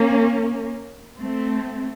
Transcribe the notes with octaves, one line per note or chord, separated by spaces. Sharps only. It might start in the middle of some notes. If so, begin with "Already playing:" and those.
Already playing: A#3 C#4
A3 C4